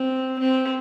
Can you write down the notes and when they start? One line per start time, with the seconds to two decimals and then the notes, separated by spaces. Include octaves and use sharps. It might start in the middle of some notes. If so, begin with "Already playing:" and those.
Already playing: C4
0.39 C4